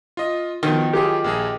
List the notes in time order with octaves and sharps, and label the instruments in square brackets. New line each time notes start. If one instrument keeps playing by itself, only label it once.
[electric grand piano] F4 D#5
[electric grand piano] B2 F3 B3 [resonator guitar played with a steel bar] D#3
[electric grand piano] F#3 F4 G#4 [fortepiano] G4
[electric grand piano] A#1 A#3 G#4